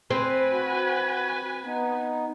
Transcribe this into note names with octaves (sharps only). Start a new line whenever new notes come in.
C4 B4 G#5
F#4
B3 D#4